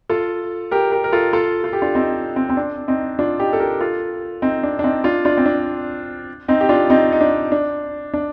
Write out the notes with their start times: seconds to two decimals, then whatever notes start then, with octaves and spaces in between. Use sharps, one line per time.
0.09 F4 A4
0.71 G4 A#4
0.92 G4 A#4
1.04 A#4
1.12 F4 A4
1.33 F4 A4
1.64 F4
1.73 G4
1.82 D4 F4
1.95 C4 D#4
2.36 C4
2.49 C4
2.57 D4
2.88 C4 D#4
3.19 D4 F4
3.40 D#4 G4
3.53 A4
3.60 G4 A#4
3.80 F4 A4
4.42 C4 D#4
4.63 D4
4.79 D4
4.84 C4 D#4
5.04 D4 F4
5.25 D4 F4
5.37 C4
5.46 D4
6.48 C4 D#4
6.61 G4
6.69 D4 F4
6.90 C4 D#4
7.12 D#4
7.21 D4
7.52 D4
8.14 D4